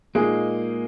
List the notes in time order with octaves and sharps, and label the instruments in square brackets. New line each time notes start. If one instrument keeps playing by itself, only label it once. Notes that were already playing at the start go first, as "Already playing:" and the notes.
[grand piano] A#2 G#3 D#4 G#4 [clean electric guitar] A#3